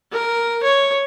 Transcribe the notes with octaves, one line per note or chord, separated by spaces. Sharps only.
A#4
C#5